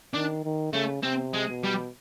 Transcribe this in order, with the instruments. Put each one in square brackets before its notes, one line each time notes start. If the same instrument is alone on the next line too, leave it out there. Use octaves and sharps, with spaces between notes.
[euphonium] D#3 [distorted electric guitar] D4
[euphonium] D#3
[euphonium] C#3 [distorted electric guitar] A3
[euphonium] C3 [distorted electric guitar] C4
[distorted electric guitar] G#3
[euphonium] B2
[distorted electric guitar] G3